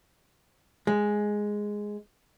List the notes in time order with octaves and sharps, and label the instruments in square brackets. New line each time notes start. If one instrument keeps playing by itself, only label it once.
[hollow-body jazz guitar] G#3